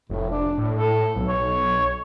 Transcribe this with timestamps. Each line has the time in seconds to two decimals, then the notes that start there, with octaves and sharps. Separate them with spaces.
0.10 F1 A2
0.31 D4
0.57 A2
0.74 A4
1.16 B1
1.28 C#5